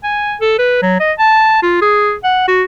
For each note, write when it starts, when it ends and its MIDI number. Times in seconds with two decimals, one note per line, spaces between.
0.04 0.35 80
0.41 0.54 69
0.59 0.78 71
0.82 0.95 54
1.00 1.12 75
1.19 1.59 81
1.63 1.78 65
1.82 2.14 68
2.24 2.46 78
2.48 2.63 66